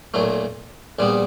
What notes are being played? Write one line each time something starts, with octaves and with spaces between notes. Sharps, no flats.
B1 A#2 F#3 A3
A#1 A#2 G3 B3